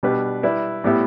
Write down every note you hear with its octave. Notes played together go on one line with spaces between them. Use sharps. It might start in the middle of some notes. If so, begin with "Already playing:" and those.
B2 G3 D4 G4 B4
G3 E4 B4 D5
A2 G3 B3 G4 E5